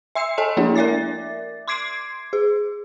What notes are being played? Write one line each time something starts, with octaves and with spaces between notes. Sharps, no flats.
E5 C6 E6 C7 C#7
A4 D#5 G#5 A5
F3 A#3 D4 E4
A#4 D5 E5 D6 A6
C6 D6 G#6 C7 D7
G#4